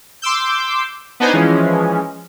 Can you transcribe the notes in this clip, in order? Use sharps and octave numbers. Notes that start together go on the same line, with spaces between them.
C6 D6 E6 G6
B3 D4 D#4 B4 C5 G#5
E3 F3 G#3 C#4